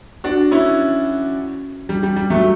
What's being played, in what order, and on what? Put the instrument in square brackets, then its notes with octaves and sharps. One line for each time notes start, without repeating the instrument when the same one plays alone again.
[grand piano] D4 F#4
C#4 E4
G3
G3
G3
F#3 A3